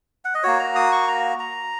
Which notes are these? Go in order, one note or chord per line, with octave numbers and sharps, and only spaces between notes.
F#5
D#5
A#3 F#4 C#5
A#5
D#6
C#6
A#5
A#5